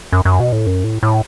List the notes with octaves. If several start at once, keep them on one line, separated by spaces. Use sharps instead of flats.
F#2
F#2
B2
A2
F#2
A2
A2